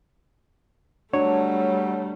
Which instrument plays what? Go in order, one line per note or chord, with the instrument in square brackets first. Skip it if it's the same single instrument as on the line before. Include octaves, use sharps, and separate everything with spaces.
[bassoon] F#3 [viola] G3 A3 [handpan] D4 [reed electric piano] C#5